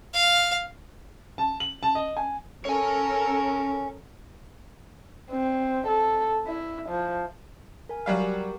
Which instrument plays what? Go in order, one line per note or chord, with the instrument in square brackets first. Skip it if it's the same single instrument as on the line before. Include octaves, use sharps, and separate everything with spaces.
[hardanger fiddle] F5
[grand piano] A5
F#7
A5
D#5
G#5
[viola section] C#4 A4 A#4 [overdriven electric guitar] C#5 G#5
[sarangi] C4
A4
E4
F3
[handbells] A#4 G#5
[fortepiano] F#3 G3 F5 [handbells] F#5
[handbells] G4 A#4 F#5